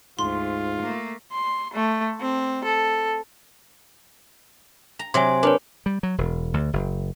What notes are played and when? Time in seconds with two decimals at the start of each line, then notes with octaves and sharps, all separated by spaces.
0.19 D2 G#2 F4 C6
0.81 A3 A#3
1.32 C6
1.73 A3
2.21 C4
2.64 A4
4.99 A#5
5.14 C3 F#3 G#5 C6
5.43 D4 A#4 B4 C#5
5.86 G3
6.03 F#3
6.18 E1
6.54 D2
6.73 F#1